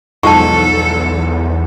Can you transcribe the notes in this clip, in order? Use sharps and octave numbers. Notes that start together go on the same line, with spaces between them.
B1 E2 G#2 F3 A4 A5 C#6